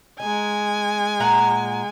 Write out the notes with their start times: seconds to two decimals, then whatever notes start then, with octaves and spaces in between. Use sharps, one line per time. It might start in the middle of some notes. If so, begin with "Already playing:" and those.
0.20 G#3 D#4 G#5
1.20 A#2 F#5 A#5